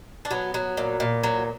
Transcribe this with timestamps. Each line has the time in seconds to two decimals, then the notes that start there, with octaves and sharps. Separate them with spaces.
0.25 D4
0.31 F#3 B3
0.54 F#3
0.77 A#2
1.00 A#2
1.23 F#3